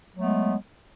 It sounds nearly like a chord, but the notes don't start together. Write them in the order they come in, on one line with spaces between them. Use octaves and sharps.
F#3 A3 B3 G#3